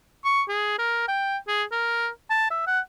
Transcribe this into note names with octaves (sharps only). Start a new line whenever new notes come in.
C#6
G#4
A#4
G5
G#4
A#4
A5
E5
F#5